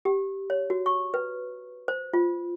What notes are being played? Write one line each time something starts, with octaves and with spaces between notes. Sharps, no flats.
G4
C#5
F#4
C#6
B4
C5
F4